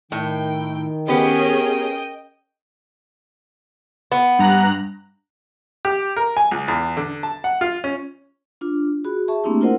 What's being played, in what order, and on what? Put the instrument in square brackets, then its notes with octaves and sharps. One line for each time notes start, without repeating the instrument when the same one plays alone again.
[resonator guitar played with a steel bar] A2 [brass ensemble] D#3 [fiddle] G5
[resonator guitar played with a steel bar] B3 G4 B4 [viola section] C#4 G#4 A#4 [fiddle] D#5 G5
[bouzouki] B3
[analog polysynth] G2 A#5 F#6
[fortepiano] G4
A#4
G#5
C#2
E2
D3
A5
F#5
F4
C#4
[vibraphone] D4 F4
F#4 G#4 B5
G#4 E5 A5 C#6
A3 A#3 C4 D4 E4 G4
E4 F4 A#4 C5 D#5 F#5